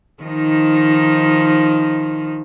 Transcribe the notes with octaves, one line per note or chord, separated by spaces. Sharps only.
D#3 F3 D#4